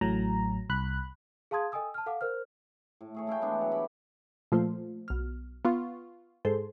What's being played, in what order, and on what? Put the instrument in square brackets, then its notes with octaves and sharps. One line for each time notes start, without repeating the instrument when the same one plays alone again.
[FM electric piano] A1 A2 F#3 A#5
C2 B5 F#6
[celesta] G#4 F5 A5 C6 D#6 G#6
A4 D#5 G5 G#5 D#6 E6
A5 F6
A4 F5 F#5 D6
A#4 C5 F6
[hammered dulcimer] A2
A3 G#4 C#5
A3 E4 F5 G5
E3 G#3 B3 D4
F#3 A4 C#5
G4 B5 D6
[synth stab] A#2 F3 [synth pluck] A3 F4 C5
[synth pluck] B1 F6
[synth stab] B3 F4 [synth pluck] C#6
[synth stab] G#2 [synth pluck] G#4 A4 C5